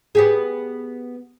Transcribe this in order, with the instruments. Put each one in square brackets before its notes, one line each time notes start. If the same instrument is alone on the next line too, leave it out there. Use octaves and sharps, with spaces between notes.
[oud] B3 G4 G#4